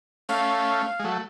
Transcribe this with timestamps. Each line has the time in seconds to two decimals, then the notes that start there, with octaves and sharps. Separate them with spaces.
0.29 A3 C#4 F5
0.99 G#3
1.04 F#3 A3